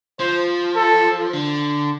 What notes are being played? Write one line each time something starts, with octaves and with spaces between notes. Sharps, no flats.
F3 C5
A4
D3